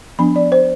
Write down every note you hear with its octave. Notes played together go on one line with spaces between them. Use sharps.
F3 B3 D4 B5
D5
C5